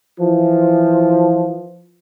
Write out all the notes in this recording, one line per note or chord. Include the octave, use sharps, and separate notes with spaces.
E3 F3